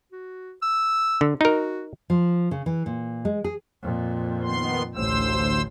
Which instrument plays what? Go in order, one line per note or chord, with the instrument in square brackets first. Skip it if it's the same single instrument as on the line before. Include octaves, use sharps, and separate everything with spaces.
[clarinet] F#4
E6
[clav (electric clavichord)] D3
[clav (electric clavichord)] D#4 A#4 [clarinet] F#4
[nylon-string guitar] F3
C#3
E3
A#2
G#3
G#4
[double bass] F2 A#2
[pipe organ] D#3 B3 C6
[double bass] A1 [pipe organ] D2 C5 E6